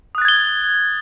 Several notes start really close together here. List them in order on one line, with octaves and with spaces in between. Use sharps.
D#6 F#6 A6 G#6 G7